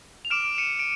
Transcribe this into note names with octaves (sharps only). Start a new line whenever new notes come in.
F7
D6 F6 D7 E7
C#7 D#7
D7